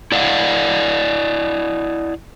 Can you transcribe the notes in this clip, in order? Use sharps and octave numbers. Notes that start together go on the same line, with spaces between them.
E4 D5 D#5 F5 F#5